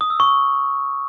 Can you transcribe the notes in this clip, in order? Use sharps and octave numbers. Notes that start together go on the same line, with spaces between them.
D#6
E6
C#6